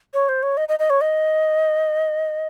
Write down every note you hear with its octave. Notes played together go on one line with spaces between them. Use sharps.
C#5
C5
C#5
D#5
D#5
D#5
C#5
D#5